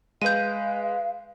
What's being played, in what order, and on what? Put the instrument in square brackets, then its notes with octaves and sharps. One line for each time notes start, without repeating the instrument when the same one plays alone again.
[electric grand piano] G#3 B4 [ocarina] F5 [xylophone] G6 D#7